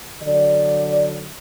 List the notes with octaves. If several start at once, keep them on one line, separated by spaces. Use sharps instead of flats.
D3 F#3 D5